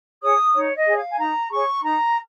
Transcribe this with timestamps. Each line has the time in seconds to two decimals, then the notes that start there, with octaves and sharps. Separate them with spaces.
0.22 G#4 C#5 D#6
0.54 D#4 C#5
0.75 D#5
0.86 G#4 C#5
0.97 F5
1.09 G#5
1.18 D#4 A#5
1.51 G#4 C#5 C#6
1.82 D#4 A#5